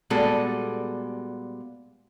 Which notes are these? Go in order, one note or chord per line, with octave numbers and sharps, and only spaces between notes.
A#2 G3 G#3 B3 F#4 A4